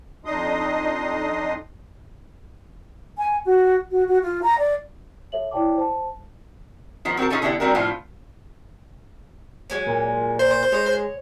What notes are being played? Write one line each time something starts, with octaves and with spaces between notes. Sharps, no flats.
F2 D4 D#4 D#5 C6 D#6
G#5
F#4
F#4
F#4
F4
A#5
D5
A4 C#5 E5 F#7
E4 C#5 D5 G5 A5 D6
C5 A5
D#3 F3 B3
C4 F#4 A#4 A5
C#4 D#4 F4 G#4 A4
D3 B3 E4 G4 A#4 D5
G3 C4 D4 F#4 A#4
A2 F3 B3 D4 F4
F#3 G#3 C#4
A#2
C5
G#3 C#5